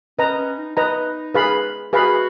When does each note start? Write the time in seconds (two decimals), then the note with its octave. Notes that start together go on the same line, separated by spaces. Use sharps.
0.19 C#4 B4 D#5 A#5
0.38 C#4
0.58 D#4
0.76 D#4 B4 D#5 A#5
1.34 G#4 B4 F5 B5
1.93 F#4 G#4 B4 F5 B5